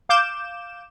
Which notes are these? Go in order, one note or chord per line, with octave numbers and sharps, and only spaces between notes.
F5 D6 G6 E7